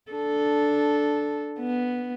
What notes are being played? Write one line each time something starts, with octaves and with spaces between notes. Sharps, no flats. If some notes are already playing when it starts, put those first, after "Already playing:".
D4 A4
B3